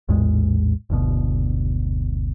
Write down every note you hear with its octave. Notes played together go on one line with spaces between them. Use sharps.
A#1 E2 A2 G#3
F#1 D2 B2